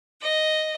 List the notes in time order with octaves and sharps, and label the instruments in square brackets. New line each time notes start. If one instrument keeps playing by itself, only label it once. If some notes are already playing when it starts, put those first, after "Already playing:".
[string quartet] D#5